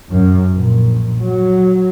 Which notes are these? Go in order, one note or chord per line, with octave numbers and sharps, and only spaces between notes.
F#2
A#1
F#3